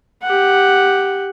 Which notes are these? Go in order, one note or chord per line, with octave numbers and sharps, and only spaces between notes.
G4 F#5